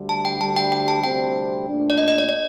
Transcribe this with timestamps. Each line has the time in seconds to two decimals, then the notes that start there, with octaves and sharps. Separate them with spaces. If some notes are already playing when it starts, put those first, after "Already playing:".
Already playing: D2 D3 G3
0.09 A5
0.25 G5
0.41 D2 D3 G3 A5
0.56 G5
0.72 G5
0.88 A5
1.03 D2 C3 G3 C4 G5
1.66 A#2 A3 D4
1.90 D5
1.98 D#5
2.08 D#5
2.18 D5
2.29 D5